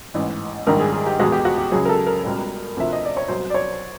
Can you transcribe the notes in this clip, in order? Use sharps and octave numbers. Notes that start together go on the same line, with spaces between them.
A1 G#2 E3
A#1 G#2 D#3 G3 A#4
G#4
G#4
G4
E2 B2 G#3 F#4
G4
F#4
G4
C#2 C#3 F#3 G#4
A#4
A4
A#4
C#2 B2 G3
D2 C3 F3 E5
D#5
D5
C#5
C2 B2 F#3 C5
D5
C#5